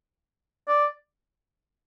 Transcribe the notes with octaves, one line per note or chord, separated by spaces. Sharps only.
D5